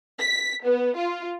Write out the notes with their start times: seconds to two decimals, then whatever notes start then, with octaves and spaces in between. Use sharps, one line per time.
0.20 B6
0.65 B3
0.97 F4